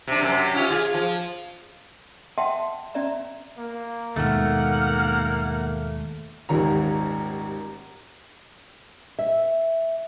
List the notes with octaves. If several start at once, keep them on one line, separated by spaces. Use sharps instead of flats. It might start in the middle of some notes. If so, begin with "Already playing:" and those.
C3 D4
F#2 C3
C#4 F4 G4
F4 G#4
F3
E5 F#5 G5 A5 C6
C#4 D5 E5 A#5
A#3
D#2 G#2 B2 A3 F#5 F6
D#1 G#1 D#2 F4 A#5
E5